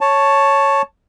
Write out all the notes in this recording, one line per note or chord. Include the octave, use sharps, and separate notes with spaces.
C#5 A5